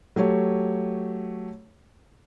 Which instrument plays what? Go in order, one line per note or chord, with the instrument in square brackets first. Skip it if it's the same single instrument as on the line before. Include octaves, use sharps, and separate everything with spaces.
[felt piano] F#3 A3 G4 C#5